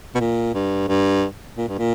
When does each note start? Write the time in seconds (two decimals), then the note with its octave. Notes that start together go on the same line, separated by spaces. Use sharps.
0.15 B2
0.20 A#2
0.54 G2
0.88 G2
1.57 A#2
1.68 G2
1.78 A#2